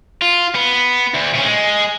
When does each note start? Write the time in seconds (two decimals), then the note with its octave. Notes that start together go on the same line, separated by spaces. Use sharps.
0.22 F4
0.55 B3
1.14 D2
1.34 A#2 C#4
1.45 G#3